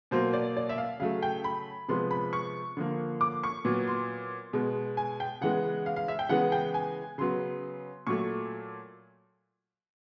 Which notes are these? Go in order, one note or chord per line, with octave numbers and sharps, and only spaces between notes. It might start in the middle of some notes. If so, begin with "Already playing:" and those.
B2 F#3 A#3 C5
D5
D5
E5
F5
C#3 F#3 A3 F5
G5
B5
C3 F3 G#3 B3 C6
B5
C#6
D3 F3 A#3
D6
C#6
A#2 F#3 B3
C6
B2 G#3 B3
G#5
G5
C#3 E3 G#3 B3 F#5
F5
F5
E5
G5
C#3 E3 G#3 B3 F#5
G5
G#5
C#3 F#3 B3 C6
A#2 F#3 A3 C#6